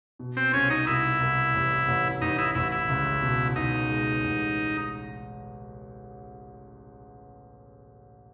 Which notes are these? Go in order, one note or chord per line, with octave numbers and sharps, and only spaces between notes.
B2
C4
C2 C#4
D#4
C2 E4
C2
A1
A1
A1 D#4
E4
A1 E4
E4
C#2
B2
C#2 D#4
G#3
A1